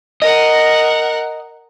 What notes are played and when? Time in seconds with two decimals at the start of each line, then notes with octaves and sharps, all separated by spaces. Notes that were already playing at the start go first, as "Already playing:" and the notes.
0.22 A#4 D#5 F#5